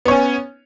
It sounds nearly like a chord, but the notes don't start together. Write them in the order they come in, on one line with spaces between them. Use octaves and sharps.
B3 C#5 C#4